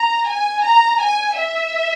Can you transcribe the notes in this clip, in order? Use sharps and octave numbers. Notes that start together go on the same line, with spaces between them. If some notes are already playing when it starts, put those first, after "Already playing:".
Already playing: A#5
G#5
A#5
G#5
E5